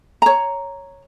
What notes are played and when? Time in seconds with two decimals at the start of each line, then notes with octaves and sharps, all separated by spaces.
0.22 C#5 A#5